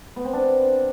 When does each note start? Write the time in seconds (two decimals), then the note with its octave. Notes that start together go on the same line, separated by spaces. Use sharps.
0.16 B3
0.25 C4
0.33 D4